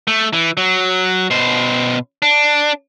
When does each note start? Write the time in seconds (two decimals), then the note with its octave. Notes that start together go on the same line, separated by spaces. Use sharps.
0.07 A3
0.33 E3
0.57 F#3
1.31 B2 C5
2.22 D4